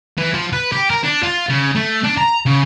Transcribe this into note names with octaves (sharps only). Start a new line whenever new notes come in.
E3
F3
B4
G4
A#4
D4
F4
C#3
A3
D4
A#5
C#3